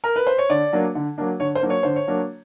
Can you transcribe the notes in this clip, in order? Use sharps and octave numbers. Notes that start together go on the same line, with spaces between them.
A#4
B4
C5
C#5
D3 D5
F#3 A#3 D4
D3
F#3 A#3 D4
D3 C#5
C5
F#3 A#3 D4
C#5
D3 C5
C#5
F#3 A#3 D4